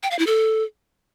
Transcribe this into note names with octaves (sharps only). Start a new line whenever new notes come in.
G5
F5
E4
A4